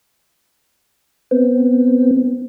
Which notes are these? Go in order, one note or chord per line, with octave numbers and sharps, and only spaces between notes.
B3 C4